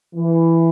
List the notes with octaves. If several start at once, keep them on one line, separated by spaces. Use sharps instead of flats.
E3